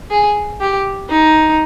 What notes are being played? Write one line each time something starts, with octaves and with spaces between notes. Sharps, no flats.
G#4
G4
D#4